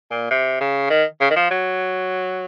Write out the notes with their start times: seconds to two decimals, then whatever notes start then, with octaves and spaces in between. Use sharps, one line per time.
0.10 A#2
0.30 C3
0.60 C#3
0.90 D#3
1.20 C#3
1.30 D#3
1.36 F3
1.51 F#3